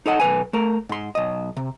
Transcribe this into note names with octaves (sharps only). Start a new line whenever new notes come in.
D#4 A4 D#5 F#5
B1 G#2 B4 G#5
A3 A#4
G#2 C6
B1 D#5
C3